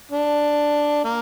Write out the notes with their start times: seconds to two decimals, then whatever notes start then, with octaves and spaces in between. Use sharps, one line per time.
0.11 D4
1.04 A#3